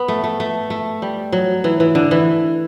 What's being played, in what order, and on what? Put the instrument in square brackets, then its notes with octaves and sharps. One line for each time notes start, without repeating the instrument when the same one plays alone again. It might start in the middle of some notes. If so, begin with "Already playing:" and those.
Already playing: [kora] B3
A3
A3
A3
A3
G3
F#3
E3
E3
D3
E3